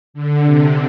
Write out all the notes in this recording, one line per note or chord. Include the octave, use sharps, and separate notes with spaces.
D3
C3